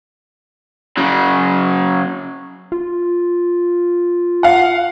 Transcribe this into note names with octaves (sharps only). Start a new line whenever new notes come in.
C#3 F#3
F4
F5 F#5